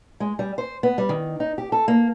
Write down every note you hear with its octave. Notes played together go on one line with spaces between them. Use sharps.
G#3
G3
C5
B3
G3
D#3
D#4
G4
A4
A#3